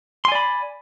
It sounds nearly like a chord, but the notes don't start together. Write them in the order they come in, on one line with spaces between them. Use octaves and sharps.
C6 G#5 D5 B5